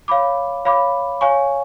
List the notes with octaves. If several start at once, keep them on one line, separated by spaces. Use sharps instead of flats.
C#5 F5 B5 D6
C#5 F5 B5 D6
C#5 F5 G#5 C#6